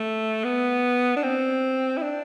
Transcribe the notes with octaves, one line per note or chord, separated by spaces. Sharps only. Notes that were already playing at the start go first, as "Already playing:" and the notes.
Already playing: A3
B3
D4
C4
E4
D4